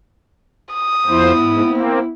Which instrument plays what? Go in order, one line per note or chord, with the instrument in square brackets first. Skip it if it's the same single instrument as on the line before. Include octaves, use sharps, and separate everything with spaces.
[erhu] D#6
[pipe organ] F2 F3 C5 [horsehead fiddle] B3 E4
[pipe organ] G#2
A#3 C4